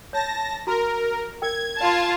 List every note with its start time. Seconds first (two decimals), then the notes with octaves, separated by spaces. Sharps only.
0.13 C#5 A5 A#6
0.67 F#4 A#4 A#5
1.42 A#4 G5 G#6
1.81 F4 D5 F5 A5 C6